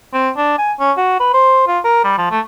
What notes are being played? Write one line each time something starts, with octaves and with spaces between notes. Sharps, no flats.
C4
D4
G#5
C#4
F#4
B4
C5
F4
A#4
G3
F3
A3